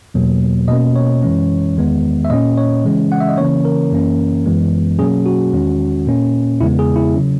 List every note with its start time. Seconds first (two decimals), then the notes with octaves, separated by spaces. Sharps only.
0.14 E2 B2 F#3 A#3
0.68 B2 A#3 C#4 D#5
0.96 C#5
1.22 F#2 E3 G#3 C#4
1.76 E2 D#3 G#3 B3
2.25 E5
2.30 A#2 A#3 C#4 D#5
2.57 C#5
2.84 C#3 E3 G#3 C#4
3.12 F#5
3.20 E5
3.29 D#5
3.38 C#3 E3 A#3 C#4 C#5
3.65 A#4
3.92 F#2 E3 A#3 C#4
4.46 F#2 E3 G#3 B3
4.98 B2 F#3 A#3 C#4 G#4
5.26 F#4
5.53 E2 D#3 G#3 C#4
6.07 A#2 A#3 C#4
6.61 E2 C#3 G#3 B3 E4
6.79 G#4
6.96 E4
7.14 C#3 F#3 C#4